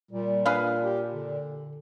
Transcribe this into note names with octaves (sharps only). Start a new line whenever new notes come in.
A#2 G3
D4 G#4 B4 F5
G4
D3